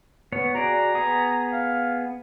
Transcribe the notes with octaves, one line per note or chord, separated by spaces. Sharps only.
B3 C#5
F#4 G#4 D5 A#5
B3 G#4 D#6
F5